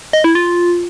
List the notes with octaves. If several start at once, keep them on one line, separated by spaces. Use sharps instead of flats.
D#5
E4
F4